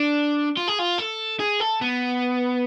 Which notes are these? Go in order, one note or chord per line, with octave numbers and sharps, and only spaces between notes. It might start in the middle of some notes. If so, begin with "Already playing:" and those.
Already playing: D4
F4
G#4
F4
A4
G#4
A4
B3